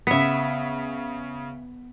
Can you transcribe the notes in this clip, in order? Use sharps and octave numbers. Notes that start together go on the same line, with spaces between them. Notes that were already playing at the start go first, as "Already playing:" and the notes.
C#3 B3 E5 B6